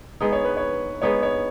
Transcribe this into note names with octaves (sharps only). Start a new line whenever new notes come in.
G#3 B3 D#4
C#5
B4
C#5
G#3 B3 D#4 C#5
C#5